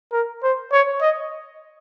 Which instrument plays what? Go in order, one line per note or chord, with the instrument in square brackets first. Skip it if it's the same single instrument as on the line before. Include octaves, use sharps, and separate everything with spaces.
[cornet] A#4
C5
C#5
D#5